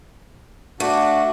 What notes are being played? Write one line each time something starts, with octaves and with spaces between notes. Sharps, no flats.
A3 D4 F#4